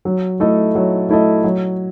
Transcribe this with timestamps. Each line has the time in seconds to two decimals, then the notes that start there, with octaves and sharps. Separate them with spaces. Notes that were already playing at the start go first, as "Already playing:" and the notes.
0.05 F#3
0.40 A3 E4 A4 D#5
0.75 F#3
1.09 A3 E4 A4 D#5
1.44 F#3